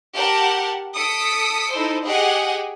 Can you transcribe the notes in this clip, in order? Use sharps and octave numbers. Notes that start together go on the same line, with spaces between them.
G4 A#4 F#5 A5
A4 D#6 B6 C#7 D7
D#4 E4 A4 C5
G4 G#4 D#5 F#5 G#5